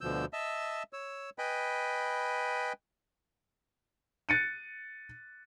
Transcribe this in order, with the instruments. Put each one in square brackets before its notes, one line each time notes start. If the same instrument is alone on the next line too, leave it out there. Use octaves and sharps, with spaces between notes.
[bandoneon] D2 B2 D3 F3 E6 G6
D#5 E5 A5 E6
C#5 E6
B4 D#5 G5 G#5 B5
[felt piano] F#6 A6 C#7 D#7